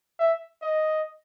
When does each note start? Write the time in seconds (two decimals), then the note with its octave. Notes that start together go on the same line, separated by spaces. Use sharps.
0.20 E5
0.62 D#5